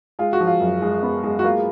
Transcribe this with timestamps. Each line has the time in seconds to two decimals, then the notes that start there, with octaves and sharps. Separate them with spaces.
0.19 G#3 F4
0.33 F#4
0.40 F3
0.47 F4
0.60 F#2
0.82 G#3
1.03 B3
1.23 G#3
1.39 F#4
1.44 A#3 F4